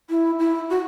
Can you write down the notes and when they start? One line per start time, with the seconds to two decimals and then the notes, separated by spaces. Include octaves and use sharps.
0.10 E4
0.39 E4
0.70 F#4